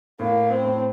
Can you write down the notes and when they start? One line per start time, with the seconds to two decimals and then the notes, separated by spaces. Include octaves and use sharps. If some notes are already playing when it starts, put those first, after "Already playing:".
0.19 A2 A#3
0.49 C4
0.63 A2